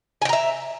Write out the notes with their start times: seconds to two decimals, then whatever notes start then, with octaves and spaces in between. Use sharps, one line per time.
0.22 G#5
0.25 G5
0.29 A#5
0.33 E5